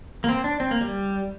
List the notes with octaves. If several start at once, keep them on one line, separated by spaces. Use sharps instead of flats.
A#3
C4
D4
C4
A#3
G3